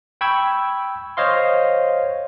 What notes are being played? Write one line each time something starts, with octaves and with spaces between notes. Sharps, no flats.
G5 B5 C#6 E6 G#6
C5 C#5 D#5 F5 C6